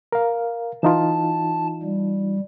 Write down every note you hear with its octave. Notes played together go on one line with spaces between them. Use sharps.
A#4 F5
E3 D#4 F4 A5
G3